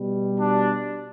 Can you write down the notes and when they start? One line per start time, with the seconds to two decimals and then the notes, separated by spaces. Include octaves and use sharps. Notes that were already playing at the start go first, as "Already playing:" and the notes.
Already playing: B2 G3
0.39 D4